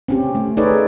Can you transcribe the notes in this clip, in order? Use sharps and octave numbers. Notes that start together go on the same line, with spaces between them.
C4 C#4 G4
A3
D#4 G#4 A4 B4 C#5 D5